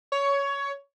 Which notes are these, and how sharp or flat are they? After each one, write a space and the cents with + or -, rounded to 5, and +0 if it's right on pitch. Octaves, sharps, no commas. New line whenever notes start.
C#5 +15